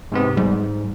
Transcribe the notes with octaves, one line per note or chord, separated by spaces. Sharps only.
G#2 C3 B3
G#2 G3